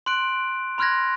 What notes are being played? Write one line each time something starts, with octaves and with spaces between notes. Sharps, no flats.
C6 F#6 D7
B5 C6 F6 F#6 G#6 A#6